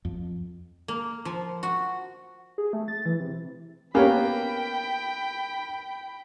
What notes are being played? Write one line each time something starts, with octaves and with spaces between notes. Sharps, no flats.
F2
A#3
F3
F#4
G#4
A3
A6
E3
C3
A#3 B3 C#4 G4 A#4 C#5 G5 B5